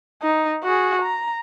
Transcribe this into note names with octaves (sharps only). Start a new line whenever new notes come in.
D#4
F#4 G#4
A#5